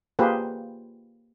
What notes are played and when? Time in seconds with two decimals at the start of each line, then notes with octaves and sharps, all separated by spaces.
0.19 A#3 F4 G4 G#4 B4 C5